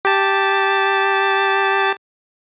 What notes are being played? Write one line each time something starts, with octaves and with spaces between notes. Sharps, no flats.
G4 A5